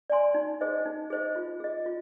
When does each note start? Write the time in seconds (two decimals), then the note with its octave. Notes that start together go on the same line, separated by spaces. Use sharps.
0.10 D5 G#5 C6
0.34 D#4
0.61 G#4 C5 D#5
0.86 D#4
1.10 G#4 C5 D#5
1.36 F4
1.60 G#4 D#5
1.86 F4